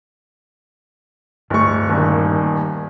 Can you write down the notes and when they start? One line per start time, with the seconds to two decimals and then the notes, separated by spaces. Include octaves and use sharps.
1.50 D1 G2 A3 C#6
1.89 D#1 D#2